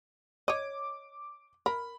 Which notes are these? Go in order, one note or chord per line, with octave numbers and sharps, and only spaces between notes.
C#5 D#5 D6
A#4 B5